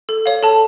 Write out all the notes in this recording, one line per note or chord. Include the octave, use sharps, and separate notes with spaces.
A4
C#5 F5
A4 A5